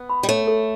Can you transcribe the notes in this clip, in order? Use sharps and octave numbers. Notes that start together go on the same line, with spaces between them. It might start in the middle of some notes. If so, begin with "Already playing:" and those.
Already playing: B3
B5
G3
A3 C#5
A4